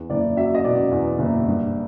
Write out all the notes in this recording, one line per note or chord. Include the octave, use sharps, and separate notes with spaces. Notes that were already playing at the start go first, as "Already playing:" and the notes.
Already playing: E2
F#1 D5
F#3 E5
D#5
B2 D5
E2
F#1
G2